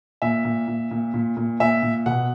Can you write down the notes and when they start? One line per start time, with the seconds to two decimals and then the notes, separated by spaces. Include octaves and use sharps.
0.22 A#2 E5
0.45 A#2
0.68 A#2
0.91 A#2
1.14 A#2
1.37 A#2
1.60 A#2 E5
1.83 A#2
2.06 B2 F#5